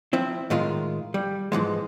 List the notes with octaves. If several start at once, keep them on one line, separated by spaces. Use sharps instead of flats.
F3 C4 E4
A2 D#3 G#3 F4
G3
G#2 E3 F3 G#3